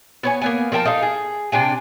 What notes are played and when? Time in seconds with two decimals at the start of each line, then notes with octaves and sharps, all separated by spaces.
0.23 B3 C#5 G#5
0.42 A#3 B3 G#5
0.72 F3 A#4 G5 A5
0.85 D#4 A4 F5
1.02 G#4
1.52 C3 D4 G5 G#5